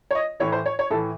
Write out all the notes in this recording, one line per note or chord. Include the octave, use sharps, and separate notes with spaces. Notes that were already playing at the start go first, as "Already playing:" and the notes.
C#5
D#5
A2 E3 C#5
C5
C#5
C#5
A2 E3 A4